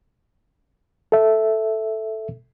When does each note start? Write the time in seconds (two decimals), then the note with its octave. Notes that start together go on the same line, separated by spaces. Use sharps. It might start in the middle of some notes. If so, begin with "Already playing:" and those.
1.12 A4 E5